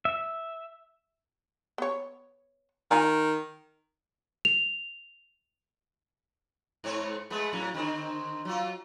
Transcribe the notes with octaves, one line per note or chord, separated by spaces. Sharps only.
E5
B3 C#5
D#3 F4 G#5 A#5
F7
G#2 C4 C#5
G#3 A3 B3
A2 F#3 C#4
D3 D#3 C4
F#3 F4